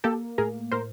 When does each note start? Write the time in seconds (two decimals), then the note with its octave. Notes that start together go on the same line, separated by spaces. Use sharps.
0.04 A#3 G4 A4
0.38 A2 G#4 A#4
0.71 A2 A#4 C5